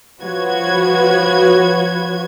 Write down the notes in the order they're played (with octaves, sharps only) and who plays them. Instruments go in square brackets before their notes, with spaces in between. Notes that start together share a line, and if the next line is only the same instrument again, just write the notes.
[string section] F3 F#4 B4 C#5 G#6